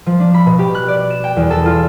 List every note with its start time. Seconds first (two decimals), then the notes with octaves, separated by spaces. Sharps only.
0.06 F3
0.20 D4
0.34 B5
0.46 B2
0.59 G4
0.75 F#6
0.88 D5
1.10 E7
1.24 G5
1.37 E2
1.51 A4
1.65 F4